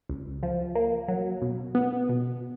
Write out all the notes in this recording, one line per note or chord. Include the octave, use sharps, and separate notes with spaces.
C#2
F3
A#3
F#3
B2
B3
B2